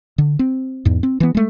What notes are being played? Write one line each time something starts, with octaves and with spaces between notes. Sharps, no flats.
D3
C4
E2 G#2
C4
E3 B3
G#3 A3